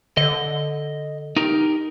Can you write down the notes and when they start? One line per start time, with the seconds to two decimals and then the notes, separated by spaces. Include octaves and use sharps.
0.17 D3 D#5
1.36 D#4 G4 A#4